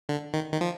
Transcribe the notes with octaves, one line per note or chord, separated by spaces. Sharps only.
D3
D#3
D#3
F3